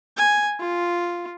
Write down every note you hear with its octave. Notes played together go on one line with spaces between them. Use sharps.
G#5
F4